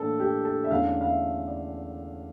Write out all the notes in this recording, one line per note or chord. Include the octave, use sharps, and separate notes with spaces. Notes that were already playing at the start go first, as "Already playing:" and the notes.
Already playing: A2 E3 A#3 D4 A4
G4
A4
E5
E2 D3 A3 C#4 F5
F5
E5
D5